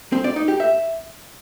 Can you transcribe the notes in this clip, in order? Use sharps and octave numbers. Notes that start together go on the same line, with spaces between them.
C4
D5
D#4
G4
E5